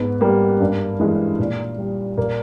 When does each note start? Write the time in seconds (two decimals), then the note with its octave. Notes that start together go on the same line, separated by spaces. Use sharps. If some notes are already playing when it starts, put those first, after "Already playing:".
Already playing: G#2 B3
0.21 G3 A#3
0.60 G2
1.00 E3 G#3
1.39 A#2
1.78 G3
2.17 A#2 A#3